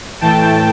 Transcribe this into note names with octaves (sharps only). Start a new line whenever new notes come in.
A2 E3 A3 G5 A5